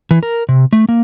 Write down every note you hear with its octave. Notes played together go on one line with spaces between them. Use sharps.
E3
A#4
C3
A3
A#3